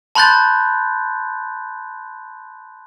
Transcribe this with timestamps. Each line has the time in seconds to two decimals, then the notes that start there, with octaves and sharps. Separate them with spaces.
0.15 A5 B5 C6 F#6 G6 A6